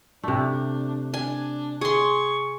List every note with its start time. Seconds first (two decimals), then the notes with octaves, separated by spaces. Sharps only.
0.23 C3 A3 D4
1.14 D4 G#5
1.81 G#4 C6 C#6